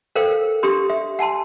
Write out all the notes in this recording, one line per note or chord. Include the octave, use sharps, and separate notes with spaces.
A4 A#4 C5 F5 G5
D4 G4 C6 D#6
E5
F#5 G#5 A5 C6